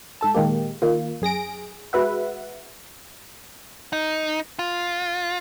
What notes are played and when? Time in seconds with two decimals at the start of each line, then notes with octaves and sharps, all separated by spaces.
0.21 G#2 A4 A5
0.34 A#2 D#3 G#3 A#3 G4
0.82 D#3 A#3 F4
1.21 F#2 G#4 A#6 D7
1.93 G#3 F#4 B4 E5 F#5
3.93 D#4
4.59 F4